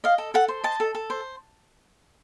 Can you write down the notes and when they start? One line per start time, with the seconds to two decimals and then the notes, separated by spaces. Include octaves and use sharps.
0.04 D#5 F5
0.18 A4
0.34 A4 F#5
0.48 C5
0.64 D#5 A5
0.80 A4
0.95 A4
1.10 C5